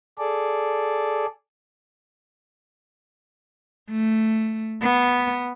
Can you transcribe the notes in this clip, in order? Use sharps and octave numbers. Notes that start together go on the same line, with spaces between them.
G#4 A4 D5
A3
B3